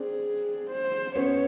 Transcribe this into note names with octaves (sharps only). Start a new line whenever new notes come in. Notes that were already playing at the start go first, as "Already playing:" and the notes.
Already playing: C4 D4 G#4
C5
B3 C#4 C#5